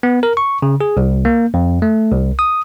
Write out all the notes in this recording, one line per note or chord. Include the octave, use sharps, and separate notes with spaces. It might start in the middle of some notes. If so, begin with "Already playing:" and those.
B3
A#4
C#6
C#3
G#4
C2
A#3
F2
A3
C2
D#6